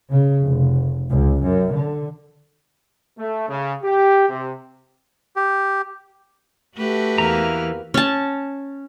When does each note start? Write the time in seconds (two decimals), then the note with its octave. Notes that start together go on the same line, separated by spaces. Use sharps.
0.10 C#3
0.44 F1
1.10 C#2
1.42 F#2
1.74 D3
3.18 A3
3.49 C#3
3.83 G4
4.30 C3
5.36 G4
6.77 A3 F#4 G4 B4
7.18 E2 E3 A#3 A#5 F6
7.94 C#4 A5